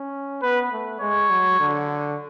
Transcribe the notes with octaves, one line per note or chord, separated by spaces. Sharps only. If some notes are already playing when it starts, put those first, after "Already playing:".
Already playing: C#4
B3 B4
A3
G#3 C#5
F#3
D3